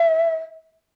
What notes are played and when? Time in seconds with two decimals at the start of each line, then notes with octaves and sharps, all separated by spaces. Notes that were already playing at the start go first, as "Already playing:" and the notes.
Already playing: E5